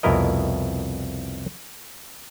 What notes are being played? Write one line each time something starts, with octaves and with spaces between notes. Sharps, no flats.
C2 F2 B2 E4 A#4 D#5